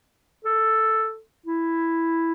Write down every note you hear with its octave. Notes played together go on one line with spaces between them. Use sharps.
A4
E4